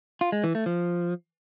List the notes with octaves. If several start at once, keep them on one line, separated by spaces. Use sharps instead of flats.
F4
G#3
E3
A3
F3